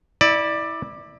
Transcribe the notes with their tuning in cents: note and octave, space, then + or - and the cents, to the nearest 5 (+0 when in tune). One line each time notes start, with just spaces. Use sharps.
E4 -20 D5 +15